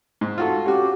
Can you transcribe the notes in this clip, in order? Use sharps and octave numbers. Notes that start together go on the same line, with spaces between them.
G#2
F4 F#4 A4
C#4 F#4 G4